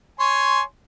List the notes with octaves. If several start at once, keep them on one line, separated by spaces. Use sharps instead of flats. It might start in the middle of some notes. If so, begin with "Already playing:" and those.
C#5 G#5 C6